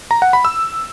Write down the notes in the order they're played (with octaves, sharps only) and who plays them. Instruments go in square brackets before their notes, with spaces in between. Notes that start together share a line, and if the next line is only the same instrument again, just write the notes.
[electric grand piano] A#5
F#5
B5
E6